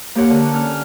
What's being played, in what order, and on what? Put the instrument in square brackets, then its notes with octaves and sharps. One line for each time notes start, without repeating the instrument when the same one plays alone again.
[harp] A#3 G4 A#4 C#5 F#5
D3
C#4 F6